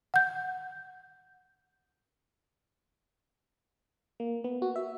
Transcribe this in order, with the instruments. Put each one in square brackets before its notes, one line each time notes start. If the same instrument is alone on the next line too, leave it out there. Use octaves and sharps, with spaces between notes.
[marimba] F#5 G6
[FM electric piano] A#3
B3
F#4
E5